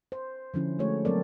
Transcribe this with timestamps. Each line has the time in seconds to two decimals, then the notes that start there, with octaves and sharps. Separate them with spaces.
0.12 C5
0.54 D3 F3 C#4 E4
0.79 G#3 A3 F#4 C#5
1.05 F#3 A#3 C4 A4 A#4 D5